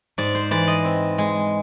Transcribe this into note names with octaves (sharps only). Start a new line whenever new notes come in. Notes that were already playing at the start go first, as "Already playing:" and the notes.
G#2 D5
C5
E3 D5
D#5
C4
G#3